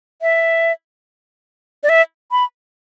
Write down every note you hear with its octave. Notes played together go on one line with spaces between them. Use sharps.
E5
D5
E5
B5